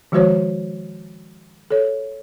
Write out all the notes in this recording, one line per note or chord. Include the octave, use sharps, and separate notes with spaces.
D#3 F3 G#3 F#4 C5 C#5
A4 C#5